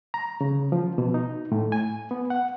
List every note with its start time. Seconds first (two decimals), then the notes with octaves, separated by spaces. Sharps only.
0.14 A#5
0.41 C#3
0.72 F3
0.98 B2
1.14 D#4
1.52 A2
1.72 G#5
2.11 B3
2.30 F#5